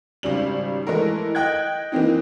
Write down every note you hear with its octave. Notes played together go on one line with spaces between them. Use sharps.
G#1 C#3 G3 F#7
E3 G#3 A3 E4 A#4
D#5 G5 F#6 G#6
E3 A#3 C4 D#4